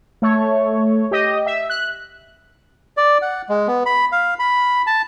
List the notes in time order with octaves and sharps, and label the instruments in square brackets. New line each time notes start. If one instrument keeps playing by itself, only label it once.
[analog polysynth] A3 C#5
G4 D#5
E5
F#6
[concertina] D5
F#5
G#3
B3
B5
F5
B5
A5